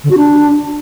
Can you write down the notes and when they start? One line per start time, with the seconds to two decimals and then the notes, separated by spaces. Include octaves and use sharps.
0.04 D3
0.10 F#4
0.17 D4